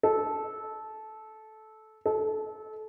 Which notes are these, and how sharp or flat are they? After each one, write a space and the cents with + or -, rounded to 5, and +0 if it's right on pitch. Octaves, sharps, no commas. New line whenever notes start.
A4 -15
A4 -25